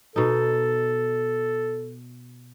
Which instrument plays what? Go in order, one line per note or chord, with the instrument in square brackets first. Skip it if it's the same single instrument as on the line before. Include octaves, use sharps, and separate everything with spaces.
[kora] B2 D#4 [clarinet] A4